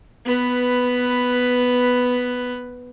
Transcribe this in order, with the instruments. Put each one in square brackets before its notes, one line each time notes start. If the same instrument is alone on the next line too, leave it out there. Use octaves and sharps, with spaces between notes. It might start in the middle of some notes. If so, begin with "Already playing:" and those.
[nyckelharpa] B3 B4